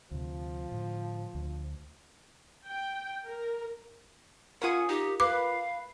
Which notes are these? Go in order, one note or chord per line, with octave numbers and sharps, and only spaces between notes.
D2 C3 F3
A2 D3
D2
G5
A#4
C#4 F4 G#4 A#4 F#5 D#6
D#4 G4
B4 F5 D6